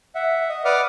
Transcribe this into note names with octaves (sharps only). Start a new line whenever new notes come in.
E5 F#5
D#5
B4 D5 F#5 D6 D#6 F6